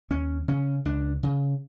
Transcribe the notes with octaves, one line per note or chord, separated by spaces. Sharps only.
D#2 C#4
C#3 C#4
C#2 D4
C#3